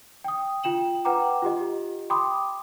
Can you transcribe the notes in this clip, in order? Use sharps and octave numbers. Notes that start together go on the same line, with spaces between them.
G5 D#6
F4 G5 E7 F#7
B4 F#5 G5 A#5 D6
F4 G4 D#5
G5 B5 C6 D6 D#6